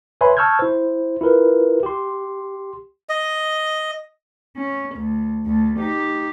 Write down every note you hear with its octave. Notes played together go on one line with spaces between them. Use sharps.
B4 C#5 E5 G#5 B5 C6
A5 C#6 E6 F6 G6 G#6
E4 C5
E4 F4 A#4 B4
G4 C6
D#5
C#4
D2
D2 A3
D#4 G4